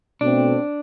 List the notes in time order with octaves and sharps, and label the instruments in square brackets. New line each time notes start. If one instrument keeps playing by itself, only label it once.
[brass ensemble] B2 A3 C4 [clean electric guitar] D4